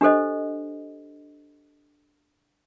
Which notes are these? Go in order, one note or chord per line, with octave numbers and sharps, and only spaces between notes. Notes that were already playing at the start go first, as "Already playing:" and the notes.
D4 G4 A4 C5 D#5